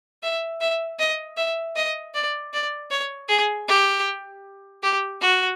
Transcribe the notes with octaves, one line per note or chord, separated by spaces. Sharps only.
E5
E5
D#5
E5
D#5
D5
D5
C#5
G#4
G4
G4
F#4